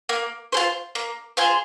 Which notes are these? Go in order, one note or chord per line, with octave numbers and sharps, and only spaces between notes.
A#3
F4 G#4 C5
A#3
F4 G#4 C5